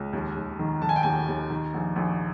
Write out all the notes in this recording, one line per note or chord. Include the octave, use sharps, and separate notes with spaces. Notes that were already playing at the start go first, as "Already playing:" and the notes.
Already playing: C#2
D#2
D#2
D#3
D#3 A5
G#5
G5
D#2 G#5
D#2
D#3
A#1
A#1